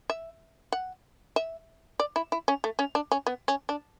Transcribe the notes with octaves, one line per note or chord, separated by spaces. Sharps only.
E5
F#5
E5
D5
E4
E4
C#4
A3
C#4
D4
C#4
B3
C#4
D4